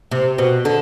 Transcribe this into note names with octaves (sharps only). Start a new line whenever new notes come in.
C3
B2
D3